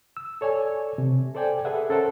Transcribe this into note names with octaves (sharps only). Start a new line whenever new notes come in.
E6
A4 C#5 D5 G#5
C3
A4 C5 D5 G5 G#5
G#4 A4 B4 E5 F#5
C#4 A4 A#4 C5 F#5